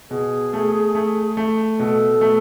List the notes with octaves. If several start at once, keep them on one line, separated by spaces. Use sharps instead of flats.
B2 G#4
A3
A3
A3
B2 A4
A3